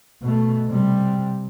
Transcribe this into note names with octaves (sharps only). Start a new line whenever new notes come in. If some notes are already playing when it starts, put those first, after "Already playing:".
B2 A3
C3 G3